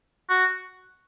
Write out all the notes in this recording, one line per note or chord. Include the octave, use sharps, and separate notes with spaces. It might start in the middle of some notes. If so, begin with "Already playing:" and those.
F#4